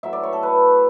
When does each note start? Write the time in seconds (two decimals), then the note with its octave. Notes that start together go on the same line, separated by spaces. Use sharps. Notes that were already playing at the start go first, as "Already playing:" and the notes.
0.03 A2 F#3 E5
0.13 D5
0.23 C#5
0.33 A4
0.43 B4